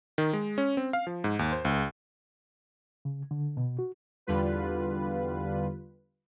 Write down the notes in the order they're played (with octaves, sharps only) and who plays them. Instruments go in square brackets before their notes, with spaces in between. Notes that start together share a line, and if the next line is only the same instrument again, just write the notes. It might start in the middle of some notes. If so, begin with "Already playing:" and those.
[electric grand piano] D#3
G#3
C#4
C4
F5
F3
G#2
D#2
C5
C#2
[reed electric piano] C#3
D3
B2
F#4
[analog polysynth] E2 D3 G3 F4 B4